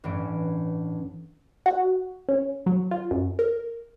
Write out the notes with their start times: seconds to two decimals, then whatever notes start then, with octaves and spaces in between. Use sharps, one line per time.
0.04 A1 G2 E3 F#3 C#4 D7
1.66 F#4
2.29 C#4
2.66 F#3
2.91 F4
3.11 F#2
3.39 A#4